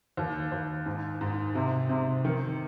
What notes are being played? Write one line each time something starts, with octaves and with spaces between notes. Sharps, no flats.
D#2
D#2
G#2
G#2
C3
C3
D#3